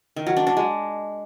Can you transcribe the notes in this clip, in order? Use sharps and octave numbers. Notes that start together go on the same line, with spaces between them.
D#3
F#3
D4
D4
G#3